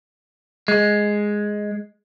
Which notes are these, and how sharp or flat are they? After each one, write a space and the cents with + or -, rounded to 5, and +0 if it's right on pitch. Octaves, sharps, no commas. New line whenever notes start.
G#3 +0